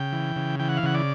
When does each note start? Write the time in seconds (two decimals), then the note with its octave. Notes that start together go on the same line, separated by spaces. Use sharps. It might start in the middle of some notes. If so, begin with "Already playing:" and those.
Already playing: C#3 G5
0.12 E3
0.36 C#3
0.59 E3 G5
0.69 F#5
0.77 F5
0.83 C#3 F#5
0.94 D5